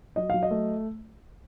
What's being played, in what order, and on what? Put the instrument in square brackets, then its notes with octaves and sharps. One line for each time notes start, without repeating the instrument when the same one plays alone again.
[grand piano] F#3 D#5
F#3 F5
D#5
A3